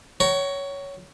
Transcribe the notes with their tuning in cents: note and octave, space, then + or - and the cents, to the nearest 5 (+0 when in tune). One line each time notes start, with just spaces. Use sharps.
C#5 +10 F#5 +45 A#5 +0